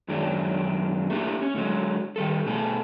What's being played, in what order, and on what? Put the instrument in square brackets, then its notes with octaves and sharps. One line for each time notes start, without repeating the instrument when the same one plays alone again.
[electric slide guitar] F#2 D#3 F#3 G#3 D4
A3 A#3 D4 G4
C#4
A2 D3 F#3 G#3
D#3 G3 A4
B2 A3 G#4 A4